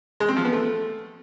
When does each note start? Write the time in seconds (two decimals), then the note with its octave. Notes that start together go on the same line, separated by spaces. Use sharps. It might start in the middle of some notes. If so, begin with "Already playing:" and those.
0.20 G#3
0.28 C4
0.37 F3
0.45 B3
0.53 A3